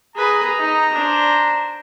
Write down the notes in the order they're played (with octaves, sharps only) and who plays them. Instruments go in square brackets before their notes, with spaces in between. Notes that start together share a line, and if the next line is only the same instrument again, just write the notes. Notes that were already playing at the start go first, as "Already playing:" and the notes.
[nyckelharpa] G#4 B4 [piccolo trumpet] A#5
[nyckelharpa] D#4
D4 C5